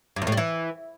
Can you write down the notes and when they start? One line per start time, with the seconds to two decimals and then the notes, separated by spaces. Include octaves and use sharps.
0.16 G2
0.22 E2
0.27 A2
0.32 G3
0.37 E3